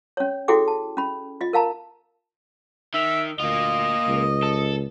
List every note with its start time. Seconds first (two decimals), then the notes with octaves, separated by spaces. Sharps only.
0.17 C#4 C#5
0.48 E4 F#4 G#4 A4 G5 D6
0.68 A5
0.97 C#4 B5
1.41 F4 D#5
1.53 A#4 F5 A5 A#5
2.94 D#3 E5
3.39 D2 A#3 F4 D#5
4.07 C#2
4.43 A4